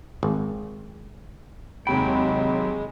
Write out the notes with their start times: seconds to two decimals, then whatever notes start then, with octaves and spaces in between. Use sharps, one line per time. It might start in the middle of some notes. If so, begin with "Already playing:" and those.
0.23 G#1
1.87 D#2 C3 F#3 G#3 G5 B5